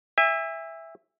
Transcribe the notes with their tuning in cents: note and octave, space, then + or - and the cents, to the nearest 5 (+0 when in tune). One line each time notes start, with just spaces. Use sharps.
E5 +0 G#5 -40